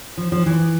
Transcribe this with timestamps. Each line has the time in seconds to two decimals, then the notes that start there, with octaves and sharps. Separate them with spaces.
0.17 F3
0.32 F3
0.46 E3